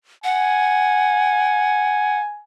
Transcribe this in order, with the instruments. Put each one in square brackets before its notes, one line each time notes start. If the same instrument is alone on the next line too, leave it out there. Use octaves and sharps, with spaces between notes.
[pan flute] F#5 [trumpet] G#5